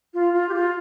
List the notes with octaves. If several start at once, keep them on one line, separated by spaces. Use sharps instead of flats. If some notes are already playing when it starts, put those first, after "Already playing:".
F4
F4
G4
F4